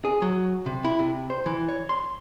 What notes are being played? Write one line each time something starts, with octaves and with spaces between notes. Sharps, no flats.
G#4
F#3
C3
E4
C3
C5
E3
C#5
C6